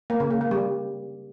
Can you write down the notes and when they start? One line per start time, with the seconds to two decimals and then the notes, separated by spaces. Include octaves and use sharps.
0.10 A#3
0.20 C#3
0.31 A#3
0.41 A#3
0.51 G3